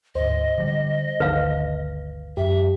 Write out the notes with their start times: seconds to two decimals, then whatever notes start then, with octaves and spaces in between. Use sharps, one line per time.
0.15 D2 G#2 C5 D#5
0.58 D3 F3 G3
1.20 G1 D2 D#3 B4 F5
2.37 F#2 G4 E5